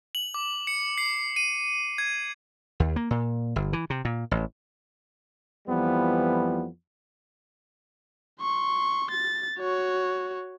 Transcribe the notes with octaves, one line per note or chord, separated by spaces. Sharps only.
F#7
D6
C#7
C7
D#7
G#6
D#2
A#3
A#2
G1
E3
C3
A#2
A1
F2 E3 F3 G3 B3
C6 C#6
A6
F#4 C#5